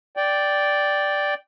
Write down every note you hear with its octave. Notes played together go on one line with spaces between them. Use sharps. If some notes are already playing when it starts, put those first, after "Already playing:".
D5 G5